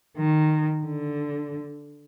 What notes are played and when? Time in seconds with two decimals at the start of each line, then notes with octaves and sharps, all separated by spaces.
0.17 D#3
0.85 D3